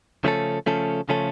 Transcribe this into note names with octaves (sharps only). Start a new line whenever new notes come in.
C#3 F3 A3 C#4 A4
C#3 F3 A3 C#4 A4
C#3 F3 A3 C#4 A4